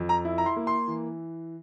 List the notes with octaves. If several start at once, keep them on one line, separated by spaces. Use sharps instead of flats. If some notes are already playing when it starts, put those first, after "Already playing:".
Already playing: F2
A#5
E4
A#5
C6
A#3
C6
E3